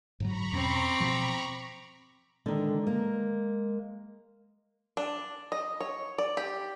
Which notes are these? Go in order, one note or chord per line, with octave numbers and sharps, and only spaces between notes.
G#2 D3 F#3 A#5 B5 C#6
E2 B2 C4 C#4 D6
B2 F3
D3 D#3 G#3
A#3
D4
D#5
C#5
D5
G4